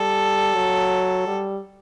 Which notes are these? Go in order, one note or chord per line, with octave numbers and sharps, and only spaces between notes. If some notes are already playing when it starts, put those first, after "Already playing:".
Already playing: G3 A4
F#3
G3